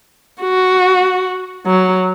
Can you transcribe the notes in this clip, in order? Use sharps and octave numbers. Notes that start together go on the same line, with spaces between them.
F#4
F#3